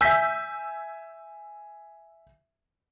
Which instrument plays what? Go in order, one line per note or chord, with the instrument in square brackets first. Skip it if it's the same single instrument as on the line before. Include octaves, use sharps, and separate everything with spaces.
[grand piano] E5 G#5 [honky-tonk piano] E6 G6 B6